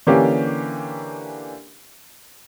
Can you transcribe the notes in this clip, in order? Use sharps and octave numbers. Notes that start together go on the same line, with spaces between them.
D3 E3 A#3 C#4 G4